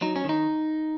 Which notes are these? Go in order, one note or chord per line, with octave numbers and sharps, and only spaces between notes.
F#3 D#4
C#4
D#3 D#4